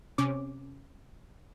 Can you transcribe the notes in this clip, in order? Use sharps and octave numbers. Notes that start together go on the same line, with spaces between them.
C3 C#4 D6